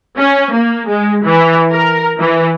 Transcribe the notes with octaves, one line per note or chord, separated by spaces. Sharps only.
C#4
A#3
G#3
E3
A#4
E3